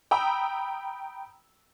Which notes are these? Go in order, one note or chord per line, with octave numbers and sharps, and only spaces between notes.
G5 A#5 B5 D#6 E6